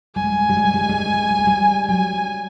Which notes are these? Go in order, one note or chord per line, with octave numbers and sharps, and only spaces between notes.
G3 G#5
G#3
G3
G#3
G3
G#3
G3
G#3
G3
G#3
G3
G#3
G3
G#3
G3
G#3
G3
F#3 G#5